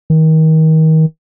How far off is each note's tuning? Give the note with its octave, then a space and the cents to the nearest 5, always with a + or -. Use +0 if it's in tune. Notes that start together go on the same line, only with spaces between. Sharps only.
D#3 +30